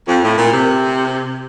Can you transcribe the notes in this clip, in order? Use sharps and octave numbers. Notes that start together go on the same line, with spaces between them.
F2
A2
A#2
C3